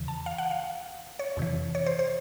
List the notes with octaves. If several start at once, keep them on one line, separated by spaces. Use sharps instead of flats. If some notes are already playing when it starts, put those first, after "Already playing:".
Already playing: E2 C#3 E3
A5
F5
F#5
F5
C#5
F2 C3 E3
C#5
C5
C5